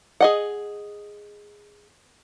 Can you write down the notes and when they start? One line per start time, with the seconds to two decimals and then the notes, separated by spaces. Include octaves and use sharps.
0.21 G#4 D#5 F#5